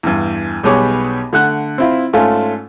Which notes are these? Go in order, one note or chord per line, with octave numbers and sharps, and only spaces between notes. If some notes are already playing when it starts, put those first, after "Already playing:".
E2 G2
B1 G3 B3 G#4 C#5 D6
D3 A3 F#5 F#6
C4 E4 F4
G#2 A3 C#4 F4